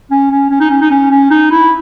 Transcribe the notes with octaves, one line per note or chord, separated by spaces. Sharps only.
C#4
C#4
C#4
D#4
C#4
D#4
C#4
C#4
D#4
E4